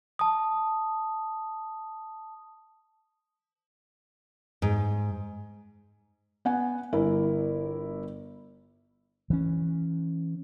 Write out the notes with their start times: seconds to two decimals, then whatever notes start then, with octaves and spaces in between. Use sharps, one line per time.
0.19 A5 D#6
4.62 G#2
6.45 B3 F#5 G#5
6.93 G1 E4 A#4
9.30 E3 C#4